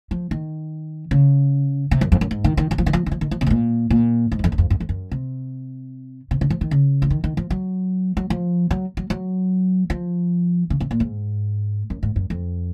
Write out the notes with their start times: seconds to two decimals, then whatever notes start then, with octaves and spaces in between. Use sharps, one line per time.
0.11 F3
0.31 D#3
1.11 C#3
1.91 C3
2.01 F#2
2.12 F2
2.21 F#2
2.31 G#2
2.44 D#3
2.57 D#3
2.71 F#3
2.78 F3
2.86 D#3
2.93 F3
3.06 D#3
3.11 F3
3.21 D#3
3.31 F3
3.41 C3
3.47 G#2
3.50 A#2
3.90 A#2
4.32 G#2
4.39 F#2
4.44 F2
4.52 F#2
4.58 F2
4.70 F#2
4.80 F2
4.89 F#2
5.12 C3
6.31 C3
6.41 C#3
6.50 F3
6.61 D#3
6.71 C#3
7.02 F3
7.10 D#3
7.24 D#3
7.37 F3
7.50 F#3
8.17 F#3
8.30 F3
8.71 F#3
8.97 F#3
9.10 F#3
9.90 F3
10.70 C#3
10.80 C3
10.91 A#2
11.00 G#2
11.90 F#2
12.03 G#2
12.16 F#2
12.30 F2